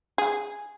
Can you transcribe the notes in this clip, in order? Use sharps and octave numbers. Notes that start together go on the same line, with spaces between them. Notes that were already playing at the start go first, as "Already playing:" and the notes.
G#4